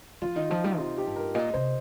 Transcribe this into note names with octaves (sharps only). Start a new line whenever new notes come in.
F3 F4
D#3 D#4
F3 F4
G3 D#4
C3 F4
G4
G2
A#4
A#2 D#5
C3 C5